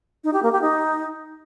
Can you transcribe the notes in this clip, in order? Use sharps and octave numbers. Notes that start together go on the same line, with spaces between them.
D#4
G4
A#3
G4
D#4